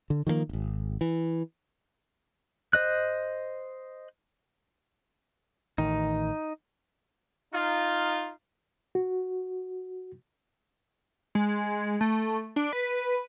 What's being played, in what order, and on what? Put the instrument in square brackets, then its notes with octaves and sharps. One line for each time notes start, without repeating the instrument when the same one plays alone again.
[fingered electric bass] D3
D#3 F3 G#3 A#3
D#1 G#1
E3
[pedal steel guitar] C5 D#5 F#6
[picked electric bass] A1 D#3 [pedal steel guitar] D#4
[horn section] D#4 F4
[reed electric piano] F#4
[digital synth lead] G#3
A3
D4
B4